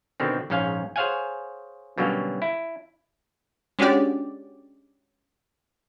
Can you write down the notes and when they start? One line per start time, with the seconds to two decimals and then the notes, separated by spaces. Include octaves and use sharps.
0.20 B2 D3 D#3 C4
0.50 A#1 G#2 C#4 C#5 F5 G#5
0.96 G#4 C5 C#5 F5 F#5 G#5
1.98 B2 D3 F#3 G3 A#3 C#4
2.42 E4
3.79 G#3 C#4 D4 F#4 G4 D5